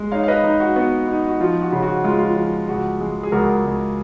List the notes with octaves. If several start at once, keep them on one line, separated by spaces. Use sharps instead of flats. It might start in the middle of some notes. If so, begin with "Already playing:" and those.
Already playing: G#3
D#4 C#5 F5
F5
B4 D#5
D#4
F#4
B3 F#4
D#4
F#4
F3 F4
F#4
C#3
F#4
G#3 F4
F4
F3
C#2 F#4
G#3
G#4
C#2 F#4 A#4
C#2